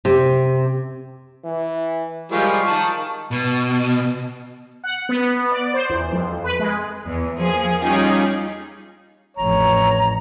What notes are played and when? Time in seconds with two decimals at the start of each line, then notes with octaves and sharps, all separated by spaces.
0.05 C3
1.44 E3
2.31 F3 G3 G#3 A#4 F5 C#6 F6
2.67 D#3 D#4 A5
3.31 B2
4.84 F#5
5.09 B3
5.52 D5
5.74 C5
5.90 E2
6.12 F2
6.44 B4
6.59 G#3
7.05 E2
7.39 F3 A#3 G#4
7.79 G3 C#4 D#4 F4 G4 G#4
9.37 A1 F2 C#5 A#5